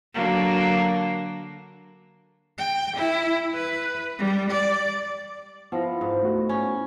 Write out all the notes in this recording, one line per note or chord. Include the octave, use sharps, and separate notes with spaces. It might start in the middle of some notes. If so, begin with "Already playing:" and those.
D3 F#3 A#3
G5
E4
B4
G3
D5
F3 B3 E4
G#2
A3 F#4
C#4